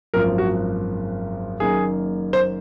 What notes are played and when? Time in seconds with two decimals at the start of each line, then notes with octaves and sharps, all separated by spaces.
0.14 G#1 F#2 F3 A#3 A#4
0.38 F#4
1.60 F#1 F#2 D#3 A#3 G#4
2.33 C5